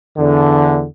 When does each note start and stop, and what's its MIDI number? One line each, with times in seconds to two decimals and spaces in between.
0.18 0.86 40
0.18 0.86 50